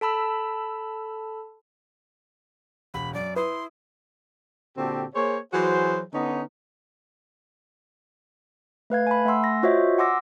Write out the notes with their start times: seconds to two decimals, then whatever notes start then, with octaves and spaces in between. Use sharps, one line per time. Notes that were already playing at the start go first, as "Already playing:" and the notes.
0.01 A4 A5 B5 E6
2.94 E1 B5
3.14 F#2 D5
3.36 E4 B4 C6 D#6
4.78 A#2 D3 C4 F#4 G4 A4
5.15 A#3 G#4 C5 C#5
5.53 E3 F#3 F#4 G#4 C5
6.14 D3 B3 C#4 D#4
8.90 A3 B4 F5 G#6
9.07 G#5 A5 B5
9.25 A3 E5 F#5 G#5 C6 E6
9.44 A#6
9.63 F4 F#4 C5 C#5 D#5 E5
9.98 F#5 G#5 C6 D6 E6 A#6